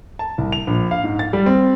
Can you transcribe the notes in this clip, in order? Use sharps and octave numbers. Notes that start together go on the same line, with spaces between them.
A5
C2
F7
A#1
F5
G#2
A6
G3
C4